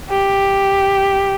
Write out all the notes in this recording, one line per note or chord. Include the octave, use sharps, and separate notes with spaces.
G4